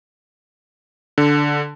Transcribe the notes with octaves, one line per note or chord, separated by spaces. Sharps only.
D3